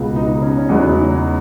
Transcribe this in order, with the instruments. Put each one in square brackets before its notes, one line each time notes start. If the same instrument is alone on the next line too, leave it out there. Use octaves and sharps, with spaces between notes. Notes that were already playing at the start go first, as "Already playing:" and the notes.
Already playing: [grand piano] C#2 B2 G#3 B3
D#4
C#4
C#4
E2 C#3 F#3 B3 D#4
D#4